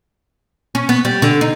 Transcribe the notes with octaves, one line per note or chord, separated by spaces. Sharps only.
C#4
B3
G3
D3
D#4